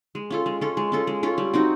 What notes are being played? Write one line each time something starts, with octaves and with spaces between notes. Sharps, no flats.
G#3
C#4 F4 A4
G#3
C#4 F4 A4
G#3
C#4 F4 A4
G#3
C#4 F4 A4
G3
C4 D#4 F#4